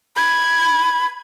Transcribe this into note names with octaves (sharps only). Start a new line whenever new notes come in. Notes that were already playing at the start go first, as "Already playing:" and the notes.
B5 G#6